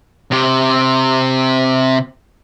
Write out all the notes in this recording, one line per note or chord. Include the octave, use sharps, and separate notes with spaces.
C3 G4